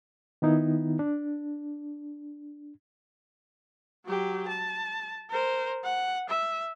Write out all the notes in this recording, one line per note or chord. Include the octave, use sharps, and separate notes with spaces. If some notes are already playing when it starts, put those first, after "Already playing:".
D#3 B3 D#4 E4
D4
F#3 G4
A5
A#4 C5
F#5
E5